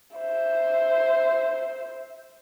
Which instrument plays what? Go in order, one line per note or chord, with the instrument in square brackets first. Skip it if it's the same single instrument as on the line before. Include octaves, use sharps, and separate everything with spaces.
[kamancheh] C5 E5